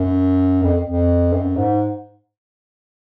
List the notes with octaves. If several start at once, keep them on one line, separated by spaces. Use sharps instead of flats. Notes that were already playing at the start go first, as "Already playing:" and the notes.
Already playing: F#2
F2
F2
F#2
G#2